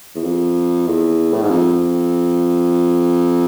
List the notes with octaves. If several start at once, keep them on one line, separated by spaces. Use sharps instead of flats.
E2
F2
E2
A2
G#2
F2